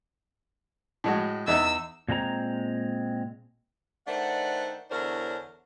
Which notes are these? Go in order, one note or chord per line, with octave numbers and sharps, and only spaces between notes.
A2 G#3 F#4
E2 D#4 E5 E6
A#2 G#3 C4 A#5
D#3 A3 D4 C5 F#5
E2 D3 D4 A#4 C5 C#5